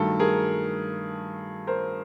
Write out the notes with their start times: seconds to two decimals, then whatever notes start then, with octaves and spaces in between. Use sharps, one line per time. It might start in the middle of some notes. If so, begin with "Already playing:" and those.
Already playing: G2 D#3 F#3 A3 A4
0.19 G#4 A#4
1.67 A#4 C5